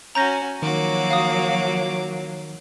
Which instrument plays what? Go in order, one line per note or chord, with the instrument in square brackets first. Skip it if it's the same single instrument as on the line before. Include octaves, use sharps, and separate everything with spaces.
[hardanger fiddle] C#4 F#4 [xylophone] A#5 G6 A#6
[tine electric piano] D#3 [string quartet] F3 F#3 A#3 [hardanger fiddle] F#4 D6
[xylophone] F5 D#6